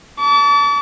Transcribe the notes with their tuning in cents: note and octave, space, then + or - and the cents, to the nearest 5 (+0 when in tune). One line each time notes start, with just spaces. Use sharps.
A5 +0 D6 -45